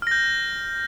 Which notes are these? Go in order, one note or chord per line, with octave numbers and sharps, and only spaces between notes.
F6 G6 A#6